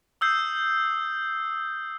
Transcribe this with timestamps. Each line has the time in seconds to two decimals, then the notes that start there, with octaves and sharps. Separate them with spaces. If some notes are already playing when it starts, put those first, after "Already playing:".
0.21 D#6 E6 G6 C7